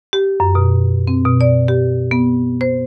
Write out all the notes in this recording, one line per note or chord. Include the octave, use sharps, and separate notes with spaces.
G4
F#2
B2
C4
B2
D5
G4
B3
C5